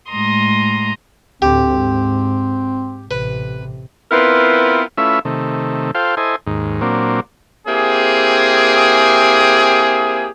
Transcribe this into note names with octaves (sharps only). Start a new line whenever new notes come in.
A2 G#3 A#5 C6 D#6
D2 A2 C4 G4
G#2
A1 C3 B4
B3 C4 E4 F4 A#4 B4
A3 C#4 E4 F4 B4 E5
C3 D#3 A3
F4 A4 C5 F5 G5
E4 A4 C5 D#5 G#5
D#2 G#2
A#2 F#3 A#3 C4 D4
A#3 C4 E4 G4 G#4